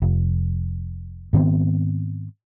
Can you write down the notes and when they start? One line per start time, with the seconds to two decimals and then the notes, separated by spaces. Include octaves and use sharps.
0.02 F1
1.33 G#2 D#3 B3 C4